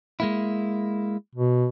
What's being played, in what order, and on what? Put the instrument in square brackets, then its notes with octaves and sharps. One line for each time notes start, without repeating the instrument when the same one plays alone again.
[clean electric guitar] G#3 A#3 E4
[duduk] B2